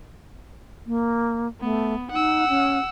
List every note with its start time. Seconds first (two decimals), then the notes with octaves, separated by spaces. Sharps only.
0.86 A#3
1.61 A3 B3
2.11 D#4 F#5 E6
2.49 C#4